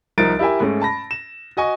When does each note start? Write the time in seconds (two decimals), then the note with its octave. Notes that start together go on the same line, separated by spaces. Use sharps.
0.18 C2 F3 D#4 A#4 A6 D7
0.39 E4 G4 A#4 E5 G#5
0.60 G#2 G#3 A3 C#4
0.82 A5 B5 A#6
1.11 E7
1.57 F#4 D#5 G#5 C#6